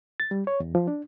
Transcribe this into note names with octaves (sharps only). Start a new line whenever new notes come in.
A6
G3
C#5
E2
F3
D4